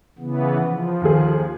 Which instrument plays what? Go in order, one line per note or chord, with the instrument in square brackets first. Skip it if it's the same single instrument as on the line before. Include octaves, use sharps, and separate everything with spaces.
[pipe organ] C#3 E3 B3
F3
[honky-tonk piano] D#2 G#4